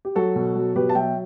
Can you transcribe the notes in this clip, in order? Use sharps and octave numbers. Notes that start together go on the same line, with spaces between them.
G4
F#3 F#4 A4
B2
F#3
B2 G4 B4
A5
F#3 E5 G5